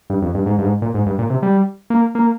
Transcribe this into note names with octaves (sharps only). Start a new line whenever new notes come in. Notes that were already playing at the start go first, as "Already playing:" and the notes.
G2
F2
G2
G#2
G2
G#2
A#2
G#2
G2
A#2
C3
G3
A#3
A#3